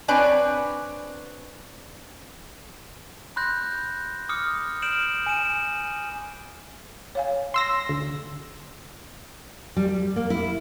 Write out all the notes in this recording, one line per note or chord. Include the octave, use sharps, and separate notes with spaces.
C4 D4 B4 C#5 D5 G#5
B5 C6 F#6 G6 A#6
D6 D#6 F6 C#7
F6 G6 D7 E7 F#7
G#5 D#7 E7
C#5 F5 G#5
C6 E6 A#6
D2
G3
G3
A#3
E4